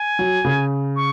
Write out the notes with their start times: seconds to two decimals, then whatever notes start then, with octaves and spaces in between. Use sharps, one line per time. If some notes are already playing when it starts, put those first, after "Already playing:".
Already playing: G#5
0.19 F#3
0.45 C#3
0.96 C#6